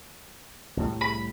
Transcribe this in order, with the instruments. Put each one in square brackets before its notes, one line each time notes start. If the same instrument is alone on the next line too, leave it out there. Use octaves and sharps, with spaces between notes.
[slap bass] C2 A2 G3
[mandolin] B5